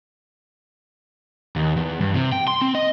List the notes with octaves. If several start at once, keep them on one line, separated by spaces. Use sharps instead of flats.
D#2
E2
G2
C3
G5
C6
C4
D#5